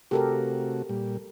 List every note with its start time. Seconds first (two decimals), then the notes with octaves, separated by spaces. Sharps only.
0.11 C3 A3 F#4 G4 A4 A#4
0.89 A#2 G3